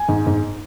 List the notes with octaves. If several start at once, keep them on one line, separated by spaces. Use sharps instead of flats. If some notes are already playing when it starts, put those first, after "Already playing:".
Already playing: G#5
G#2
G#2